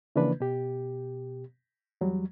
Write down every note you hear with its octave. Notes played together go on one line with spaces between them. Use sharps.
C#3 E3 F3 A#3 D4 B4
B2 G4
E2 F#3 G3